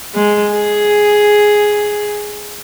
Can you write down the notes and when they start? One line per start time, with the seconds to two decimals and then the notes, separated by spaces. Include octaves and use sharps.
0.15 G#3
0.53 G#4